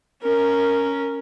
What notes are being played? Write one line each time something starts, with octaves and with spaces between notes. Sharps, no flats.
C#4 A#4